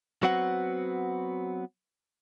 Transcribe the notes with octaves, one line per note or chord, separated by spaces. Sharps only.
F#3 B3 C4 F#4 F#5